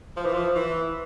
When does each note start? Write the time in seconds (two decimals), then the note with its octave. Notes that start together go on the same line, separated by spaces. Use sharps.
0.17 F3
0.25 E3
0.34 F3
0.55 E3